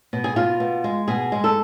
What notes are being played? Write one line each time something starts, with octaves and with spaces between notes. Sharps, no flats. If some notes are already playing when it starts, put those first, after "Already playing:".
B2
G#4
B2 F4
B2
G#3
B2 G#4
G#3
A4